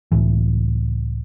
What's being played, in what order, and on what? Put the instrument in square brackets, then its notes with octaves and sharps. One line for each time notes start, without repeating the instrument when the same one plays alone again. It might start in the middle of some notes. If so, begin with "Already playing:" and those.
[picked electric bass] C#2 A2 E3